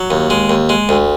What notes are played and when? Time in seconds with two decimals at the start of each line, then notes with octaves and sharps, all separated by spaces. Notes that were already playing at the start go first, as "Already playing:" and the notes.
Already playing: F#3
0.10 D#2
0.30 G#3
0.49 D#2
0.69 G#3
0.89 D2